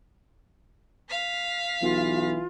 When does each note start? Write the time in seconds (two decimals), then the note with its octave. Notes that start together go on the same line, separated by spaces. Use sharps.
1.10 F5 B6
1.82 B1 E3 F4